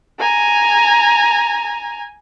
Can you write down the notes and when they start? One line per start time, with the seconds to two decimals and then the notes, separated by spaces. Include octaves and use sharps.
0.20 G#5 A#5